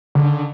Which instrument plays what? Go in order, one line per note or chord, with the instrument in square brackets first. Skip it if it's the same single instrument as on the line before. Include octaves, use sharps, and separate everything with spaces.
[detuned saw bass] D3